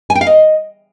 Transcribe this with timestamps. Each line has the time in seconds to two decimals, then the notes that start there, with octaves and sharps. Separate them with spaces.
0.10 G#5
0.15 G5
0.21 F5
0.27 D#5